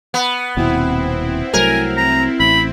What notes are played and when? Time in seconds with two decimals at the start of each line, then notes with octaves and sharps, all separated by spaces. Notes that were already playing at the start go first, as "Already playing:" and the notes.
0.14 B3
0.57 D#1 D#2 B2 C4 E4
1.53 C2 F#3 A3 A#4 G#5
1.97 A#5
2.40 A1 B5